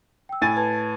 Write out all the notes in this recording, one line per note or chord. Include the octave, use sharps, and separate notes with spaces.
G5 E6
A2 G#5 A6
B4 A5 G#6